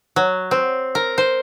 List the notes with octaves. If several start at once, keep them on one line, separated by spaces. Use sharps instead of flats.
F#3
C4
A#4
C5